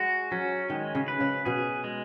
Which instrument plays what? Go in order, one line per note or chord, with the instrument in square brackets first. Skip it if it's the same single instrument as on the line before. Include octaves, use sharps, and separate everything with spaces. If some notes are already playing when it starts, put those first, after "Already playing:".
Already playing: [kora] G#3 [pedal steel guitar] F#4
[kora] F#3 [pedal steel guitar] C#4
[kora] D#3 [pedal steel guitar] G#3
[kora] C#3
[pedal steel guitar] B4
[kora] C#3
[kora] B2 [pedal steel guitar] G#4
[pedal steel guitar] G#3